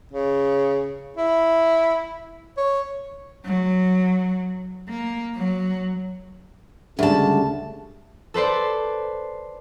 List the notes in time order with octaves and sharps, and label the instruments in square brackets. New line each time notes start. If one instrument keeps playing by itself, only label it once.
[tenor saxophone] C#3
E4
C#5
[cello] F#3
A#3
F#3
[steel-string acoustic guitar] D2 A5 [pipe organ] C#3 G3 G#3
[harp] A4 B4 C5 D5